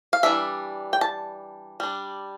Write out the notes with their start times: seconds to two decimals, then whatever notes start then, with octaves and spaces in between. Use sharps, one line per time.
0.13 F5
0.23 E3 G3 D4 E5
0.93 G5
1.01 A5
1.80 G3 D4